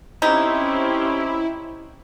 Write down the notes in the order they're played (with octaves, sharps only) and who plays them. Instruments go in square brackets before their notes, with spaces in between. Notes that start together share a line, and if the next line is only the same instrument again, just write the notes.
[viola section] C4 C#4 G4 [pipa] D#4 [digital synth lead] E4